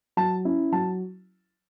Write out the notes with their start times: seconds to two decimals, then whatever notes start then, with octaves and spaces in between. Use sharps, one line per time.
0.17 F#3 A5
0.45 C#4 E4
0.72 F#3 A5